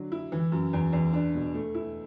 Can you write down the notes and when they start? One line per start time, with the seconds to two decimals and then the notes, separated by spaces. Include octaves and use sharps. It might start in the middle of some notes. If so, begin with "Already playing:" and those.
Already playing: D3 F#3
0.12 E4
0.32 E3
0.52 F#2
0.73 E2
0.93 E2
1.13 D4
1.34 B2
1.54 A3
1.74 E4